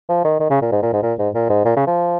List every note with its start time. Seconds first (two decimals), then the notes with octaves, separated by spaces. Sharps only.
0.09 F3
0.24 D#3
0.40 D#3
0.50 C#3
0.62 A#2
0.72 G#2
0.83 A#2
0.93 G#2
1.03 A#2
1.18 G#2
1.34 A#2
1.49 G#2
1.65 A#2
1.77 C#3
1.87 F3